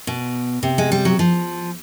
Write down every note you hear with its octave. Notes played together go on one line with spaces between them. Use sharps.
B2
C3
G#3
G3
F#3
F3